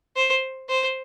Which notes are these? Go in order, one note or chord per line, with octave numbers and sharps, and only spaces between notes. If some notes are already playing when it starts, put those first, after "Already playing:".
C5
C5